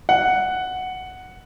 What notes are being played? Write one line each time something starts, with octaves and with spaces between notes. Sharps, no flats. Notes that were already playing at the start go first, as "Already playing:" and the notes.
F#5